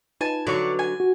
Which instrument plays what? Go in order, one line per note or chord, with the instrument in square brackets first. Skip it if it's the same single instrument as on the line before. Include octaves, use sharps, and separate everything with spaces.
[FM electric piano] D#4 F4 B4 [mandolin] G#5 A5
[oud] D3 F#3 [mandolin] D5 C#6
[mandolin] G#5
[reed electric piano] F#4